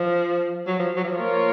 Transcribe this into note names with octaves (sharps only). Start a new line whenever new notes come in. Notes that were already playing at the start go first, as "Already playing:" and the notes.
Already playing: F3
F#3
F3
F#3
F3
A#3 F4 A#4 C#5